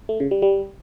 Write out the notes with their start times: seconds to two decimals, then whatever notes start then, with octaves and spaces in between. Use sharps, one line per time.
0.09 A3
0.20 C#3
0.31 G3
0.42 G3